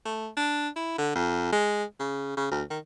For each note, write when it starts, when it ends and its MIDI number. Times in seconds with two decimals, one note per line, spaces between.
0.05 0.29 57
0.37 0.69 62
0.76 0.95 64
0.98 1.14 50
1.15 1.51 41
1.53 1.84 56
2.00 2.35 49
2.37 2.48 49
2.51 2.63 38
2.70 2.79 51